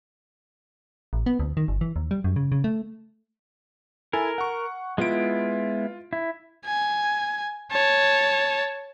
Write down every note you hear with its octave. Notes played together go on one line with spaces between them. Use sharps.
A1
B3
D2
D#3
G1
E3
D#2
G3
F#2
C#3
C#3
A3
E4 A4 A#4 G#5
F#5 C#6
G#3 B3 E4 F4 D7
E4
G#5
C#5 A5